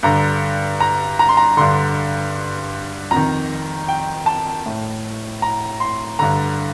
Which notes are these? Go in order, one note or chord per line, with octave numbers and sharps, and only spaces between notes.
G2 D3 A#5
A#5
A#5
C6
A#5
G2 D3 C6
F2 A#5
D#3
G5
A5
A2
A#5
C6
G2 D3 A#5